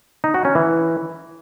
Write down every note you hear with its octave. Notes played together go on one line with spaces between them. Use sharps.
D#4
F#4
C#4
E3